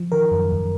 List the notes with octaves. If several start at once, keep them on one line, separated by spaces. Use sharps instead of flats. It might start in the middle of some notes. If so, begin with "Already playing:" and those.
Already playing: F3
D#3 A#4
F#2
F#2